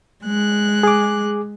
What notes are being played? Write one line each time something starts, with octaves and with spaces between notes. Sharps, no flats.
G#3 F#6
G#4 D6